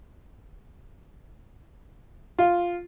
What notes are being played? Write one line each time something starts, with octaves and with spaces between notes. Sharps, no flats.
F4